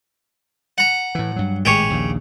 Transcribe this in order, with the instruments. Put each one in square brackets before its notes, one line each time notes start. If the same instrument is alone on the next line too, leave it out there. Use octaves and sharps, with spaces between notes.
[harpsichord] F#5 A#5
[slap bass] A2 E3
G2 F#3
[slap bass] G#1 A2 G#3 [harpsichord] G4 G#4 C#5
[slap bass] A#1 D#2 C#3